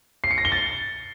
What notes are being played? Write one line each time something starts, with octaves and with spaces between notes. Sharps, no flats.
C7
C#7
A#6
G7
A6